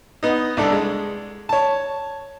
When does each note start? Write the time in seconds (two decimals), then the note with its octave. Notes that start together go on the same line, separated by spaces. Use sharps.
0.23 B3 D#4
0.57 C2 D4 A4
0.72 G#3
1.49 C#5 A5